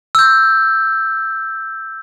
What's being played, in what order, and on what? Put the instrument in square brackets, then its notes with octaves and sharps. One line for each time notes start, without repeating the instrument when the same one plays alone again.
[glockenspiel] E6 G6